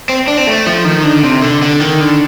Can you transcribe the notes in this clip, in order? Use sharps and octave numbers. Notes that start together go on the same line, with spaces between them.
C4
D4
C4
A3
F3
D#3
D3
C3
D3
D3
D#3
D3